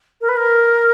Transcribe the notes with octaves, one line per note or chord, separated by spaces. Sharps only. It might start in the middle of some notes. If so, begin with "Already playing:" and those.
A#4
B4
A#4